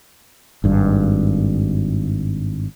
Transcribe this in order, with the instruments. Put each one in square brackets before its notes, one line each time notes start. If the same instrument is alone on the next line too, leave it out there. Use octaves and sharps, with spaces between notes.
[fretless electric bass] G#1 G2